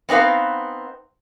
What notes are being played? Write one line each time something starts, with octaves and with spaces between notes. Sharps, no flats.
B3 C4 D#4 B4 F5